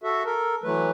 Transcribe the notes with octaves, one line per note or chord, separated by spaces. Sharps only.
F#4 A4 E5
A4 A#4
E3 F#3 A3 B4